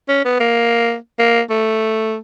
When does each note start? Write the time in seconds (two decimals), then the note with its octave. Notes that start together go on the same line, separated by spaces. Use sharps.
0.09 C#4
0.25 B3
0.40 A#3
1.19 A#3
1.50 A3